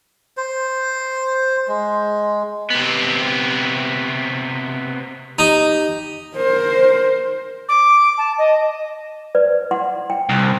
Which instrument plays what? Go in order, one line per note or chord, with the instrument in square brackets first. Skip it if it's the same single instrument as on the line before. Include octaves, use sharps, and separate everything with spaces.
[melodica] C5
G#3
[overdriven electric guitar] C3 B3
[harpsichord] D#4 [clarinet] G4
[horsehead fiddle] A#4 C5
[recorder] D6
A5
D#5
[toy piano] B4 D5
F#5 C6
G5
[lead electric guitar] C2